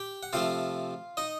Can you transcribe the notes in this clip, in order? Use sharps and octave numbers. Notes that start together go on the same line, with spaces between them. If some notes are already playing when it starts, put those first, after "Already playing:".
Already playing: G4 G5
F#5
C3 F3 A3 F4 F5
D#4 D#5